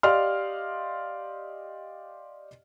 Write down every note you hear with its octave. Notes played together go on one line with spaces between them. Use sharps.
G4 D5 D#5 F5 C6 F6